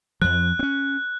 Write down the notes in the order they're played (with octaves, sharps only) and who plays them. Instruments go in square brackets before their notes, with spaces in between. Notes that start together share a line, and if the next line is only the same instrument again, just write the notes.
[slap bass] F2 F3 [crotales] F#6
[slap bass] C4 C#4